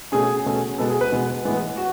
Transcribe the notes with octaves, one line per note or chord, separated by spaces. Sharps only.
B2 A3 C#4 G#4
B2 A3 C#4
B2 G#3 B3 A4
G#4
B4
B2 G#3 B3
A2 E3 G#3 B3
F#4